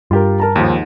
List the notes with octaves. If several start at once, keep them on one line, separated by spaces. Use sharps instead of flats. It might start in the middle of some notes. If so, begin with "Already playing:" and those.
G2 F4 G4 A#4
A#4 A5 A#5
D#2 G#2 F3